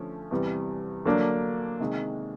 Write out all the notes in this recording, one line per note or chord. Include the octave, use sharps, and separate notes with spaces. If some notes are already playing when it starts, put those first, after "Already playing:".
Already playing: D3 F3 A3 C#4
E2 C3 E3 G3
D3 F#3 A#3 D4
C3 D#3 G#3